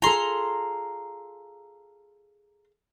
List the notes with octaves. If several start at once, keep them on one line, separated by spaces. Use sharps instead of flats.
F4 G#4 A4 A#5 C6